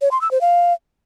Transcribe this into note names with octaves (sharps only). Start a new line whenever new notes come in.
C#5
C6
E6
C5
F5